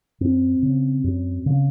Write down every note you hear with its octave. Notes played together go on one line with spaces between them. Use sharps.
F#2 C4
C#3
F#2
C#3